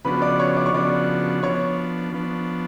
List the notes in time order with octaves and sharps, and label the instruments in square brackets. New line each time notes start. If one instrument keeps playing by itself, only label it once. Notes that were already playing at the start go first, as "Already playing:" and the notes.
[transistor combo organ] C#3 F3 B3 D4 F#4 [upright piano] B4 B5
[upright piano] D5 D6
C#5 C#6
D5 D6
C#6
[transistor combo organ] C#3 F3 B3 D4 F#4 [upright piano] D5 D6
[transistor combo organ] F3 B3 D4 [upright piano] C#5 C#6
[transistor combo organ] F3 B3 D4